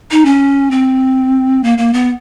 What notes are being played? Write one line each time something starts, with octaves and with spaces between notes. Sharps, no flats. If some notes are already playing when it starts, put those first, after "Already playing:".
D#4
C#4
C4
A#3
A#3
B3